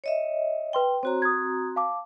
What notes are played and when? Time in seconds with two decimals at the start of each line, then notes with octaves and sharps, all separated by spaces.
0.04 C#5 D#5 E5
0.73 B4 G5 C6 G7
1.03 C4 F#4 C5 C#5 A#5
1.22 D#6 G#6
1.76 F5 A5 D6